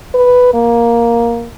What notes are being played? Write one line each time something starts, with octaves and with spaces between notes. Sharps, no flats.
B4
A#3